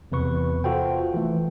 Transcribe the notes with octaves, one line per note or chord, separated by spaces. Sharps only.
E2 C3 B4 C#6
F4 F#4 A4 C5 G5
E3 A3